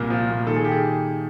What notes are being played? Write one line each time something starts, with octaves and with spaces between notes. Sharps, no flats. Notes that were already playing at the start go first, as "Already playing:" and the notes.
Already playing: C2 A#2 A#4
F3
A#2
D#3 A4
G#4
D#3 G4
G#4